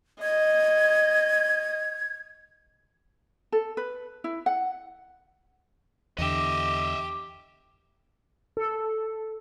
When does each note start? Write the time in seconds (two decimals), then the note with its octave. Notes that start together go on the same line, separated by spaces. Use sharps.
0.22 D#5 G#6
3.52 A4
3.77 B4
4.24 E4
4.46 F#5
6.18 E2 D3 G4 D#5 E5
8.57 A4